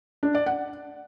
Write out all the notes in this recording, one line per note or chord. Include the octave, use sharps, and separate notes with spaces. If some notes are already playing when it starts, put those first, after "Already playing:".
D4
D5
F#5